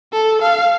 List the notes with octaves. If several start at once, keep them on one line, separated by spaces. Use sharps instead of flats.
A4
F5